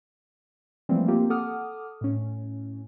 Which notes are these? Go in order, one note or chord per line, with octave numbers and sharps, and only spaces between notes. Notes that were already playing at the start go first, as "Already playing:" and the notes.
E3 F3 G3 A3 A#3 C4
A#3 C4 F4 G4
A4 F#5 D6 D#6 F6
A2 C#4